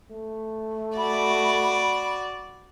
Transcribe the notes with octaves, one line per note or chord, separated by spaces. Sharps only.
A3
F#4 D5 B5